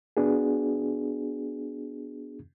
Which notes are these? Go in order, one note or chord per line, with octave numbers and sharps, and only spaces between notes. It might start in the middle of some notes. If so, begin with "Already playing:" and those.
B3 D4 F#4 G#4